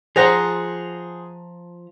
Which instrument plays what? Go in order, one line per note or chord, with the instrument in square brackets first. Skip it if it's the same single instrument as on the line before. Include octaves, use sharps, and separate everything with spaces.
[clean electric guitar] F3 A#5 [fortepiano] G#4 C5 F#5